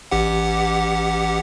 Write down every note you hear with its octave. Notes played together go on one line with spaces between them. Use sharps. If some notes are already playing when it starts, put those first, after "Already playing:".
A1 G4 F#5